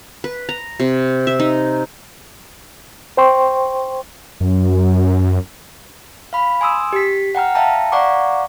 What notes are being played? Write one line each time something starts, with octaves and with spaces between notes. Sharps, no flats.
B4
A#5
C3
E5
D#4
C5 G5 C6 C#6
F#2
F5 B5
G#5 C6 D#6 E6
G4 B6
F#5 G5 A#5 F6
E5 F5 G5 A5 A#5
D5 F5 F#5 A#5 C#6 D6